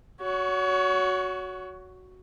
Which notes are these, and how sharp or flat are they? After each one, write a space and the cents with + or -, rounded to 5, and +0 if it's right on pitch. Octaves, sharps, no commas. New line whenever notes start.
F#4 +0 C#5 +30